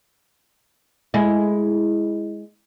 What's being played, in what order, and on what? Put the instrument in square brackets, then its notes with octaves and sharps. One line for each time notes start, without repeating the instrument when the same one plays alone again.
[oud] G#3 E4